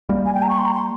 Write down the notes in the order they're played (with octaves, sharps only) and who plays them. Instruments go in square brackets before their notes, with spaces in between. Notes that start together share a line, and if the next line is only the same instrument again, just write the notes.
[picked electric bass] G3 A#3
[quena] G#5
G5
A#5
C#6
C6
A#5
C6